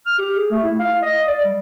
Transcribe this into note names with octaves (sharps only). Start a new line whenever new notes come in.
F6
G4
G#4
A3
E4
F5
D#5
D5
G3